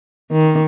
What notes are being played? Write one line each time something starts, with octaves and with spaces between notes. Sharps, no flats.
D#3